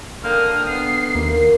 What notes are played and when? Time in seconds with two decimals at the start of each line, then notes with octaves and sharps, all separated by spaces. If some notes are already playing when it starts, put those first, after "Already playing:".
0.24 D3 A#3 G5 D#6 F6
0.69 B3 C7
1.15 D#2 A#3